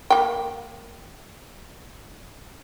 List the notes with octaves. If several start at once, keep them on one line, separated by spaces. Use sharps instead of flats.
A#3 G5